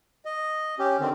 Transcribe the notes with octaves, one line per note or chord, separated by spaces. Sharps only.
D#5
C#4 G4
D3 D#3 C4